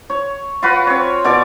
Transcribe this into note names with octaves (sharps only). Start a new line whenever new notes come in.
C#5
F4 F#4 B4
C4 C#5
B2 C#5 D5 D6